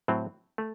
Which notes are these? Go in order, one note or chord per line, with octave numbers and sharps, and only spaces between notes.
A2 F#3 C4
A3